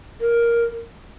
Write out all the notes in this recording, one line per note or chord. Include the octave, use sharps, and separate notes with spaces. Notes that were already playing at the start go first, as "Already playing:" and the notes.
A#4